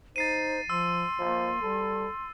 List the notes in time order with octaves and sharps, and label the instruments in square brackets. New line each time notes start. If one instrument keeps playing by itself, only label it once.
[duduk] D#4 [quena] C5 [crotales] A6 C7 D#7
[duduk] F3 [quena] C6 [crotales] E6
[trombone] F3 [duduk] A#3
[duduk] G3 [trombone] A4